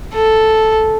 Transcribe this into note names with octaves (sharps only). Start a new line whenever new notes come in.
A4